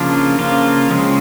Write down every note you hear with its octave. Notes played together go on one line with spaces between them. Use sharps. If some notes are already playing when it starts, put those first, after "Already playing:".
Already playing: C#3 F3 A#3 D4 F4
C#3 F3 A#3 D4 F4
C#3 F3 G#3 C4